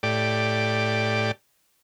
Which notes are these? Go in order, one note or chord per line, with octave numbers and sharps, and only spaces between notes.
A2 G4 D5